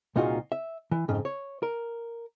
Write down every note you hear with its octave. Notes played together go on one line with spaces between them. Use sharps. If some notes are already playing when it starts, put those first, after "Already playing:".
C2 A#2 D#4 F4 F#4 G#4
E5
E3
F2 G#2 C#3
C#5
A#4